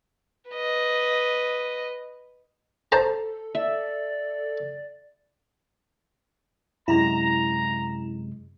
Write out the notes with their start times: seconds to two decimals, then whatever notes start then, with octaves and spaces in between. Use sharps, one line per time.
0.51 B4 D#5
2.92 A4 C5 A5 A#5
3.55 D5 E5
6.88 F#2 C3 G#3 E4 A#5